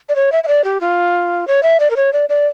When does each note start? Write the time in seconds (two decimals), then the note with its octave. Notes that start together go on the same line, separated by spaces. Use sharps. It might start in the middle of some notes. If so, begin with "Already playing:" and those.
0.09 D5
0.16 C#5
0.32 E5
0.44 E5
0.48 D5
0.64 G4
0.81 F4
1.48 C#5
1.63 E5
1.80 D5
1.91 A#4
1.96 C#5
2.13 D5
2.29 D5